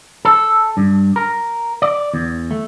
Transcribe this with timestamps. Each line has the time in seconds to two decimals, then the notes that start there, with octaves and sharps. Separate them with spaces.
0.25 A4
0.77 G2
1.16 A#4
1.82 D5
2.14 E2
2.51 A3